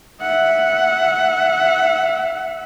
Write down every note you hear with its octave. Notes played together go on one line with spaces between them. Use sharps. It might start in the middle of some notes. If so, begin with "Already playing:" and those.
E5 F#5